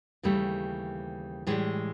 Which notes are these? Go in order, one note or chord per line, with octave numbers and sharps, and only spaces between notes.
D#2 C#3 E3 G3 A3
A2 E3 G3 G#3